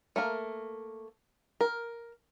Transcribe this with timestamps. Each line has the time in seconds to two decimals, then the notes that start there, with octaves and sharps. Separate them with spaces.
0.16 A3 A#3 A#4
1.61 A#4